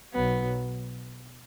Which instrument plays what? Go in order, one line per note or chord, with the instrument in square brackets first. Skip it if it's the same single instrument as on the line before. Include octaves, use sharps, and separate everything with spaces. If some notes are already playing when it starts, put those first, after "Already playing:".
[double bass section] B1 B2 F#3 [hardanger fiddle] B3